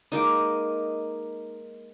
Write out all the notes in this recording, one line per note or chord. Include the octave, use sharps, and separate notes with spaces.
G#3 A#3 D#4 D#5 D6